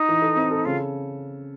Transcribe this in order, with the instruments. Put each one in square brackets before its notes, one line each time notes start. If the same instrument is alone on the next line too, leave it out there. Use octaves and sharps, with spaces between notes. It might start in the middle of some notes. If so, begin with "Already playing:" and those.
Already playing: [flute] D#4
[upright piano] E3
A4
C4
A4
[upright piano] C#3 [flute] F4